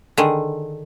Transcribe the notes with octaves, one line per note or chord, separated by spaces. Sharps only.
D3 D#3 G#4